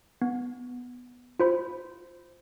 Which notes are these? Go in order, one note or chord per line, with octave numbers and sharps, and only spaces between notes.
B3
F4 C5 B5